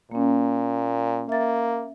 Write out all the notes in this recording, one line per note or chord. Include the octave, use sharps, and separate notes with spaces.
A#2 A#3 C#4
A#3 E5 A6